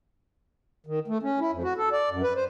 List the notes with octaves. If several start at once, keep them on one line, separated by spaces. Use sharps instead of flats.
D#3
A3
C#4
E4
F2
F#4
A4
D5
F#2
B4
C5